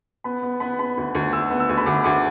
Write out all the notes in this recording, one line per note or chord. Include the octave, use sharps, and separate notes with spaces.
B3 B5
B3
B3 B5
B3 B5
D2
D2
D2 E6
B3
E6
D2
B5
D2 D6
D2 D6